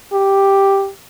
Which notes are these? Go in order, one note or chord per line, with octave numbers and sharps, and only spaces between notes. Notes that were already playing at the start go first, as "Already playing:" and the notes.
G4